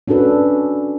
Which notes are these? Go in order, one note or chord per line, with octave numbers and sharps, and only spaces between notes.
C#4 D4 F#4 A4 B4